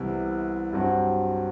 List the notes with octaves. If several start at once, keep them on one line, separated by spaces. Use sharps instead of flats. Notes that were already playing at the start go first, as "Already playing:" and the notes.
Already playing: C2 C3 E3 B3 E4
G2 F#3 C4 F#4